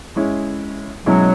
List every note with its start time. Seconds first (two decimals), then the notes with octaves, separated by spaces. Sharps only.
0.16 G#3 C#4 E4
1.06 B2 F#3 G#3 C#4 E4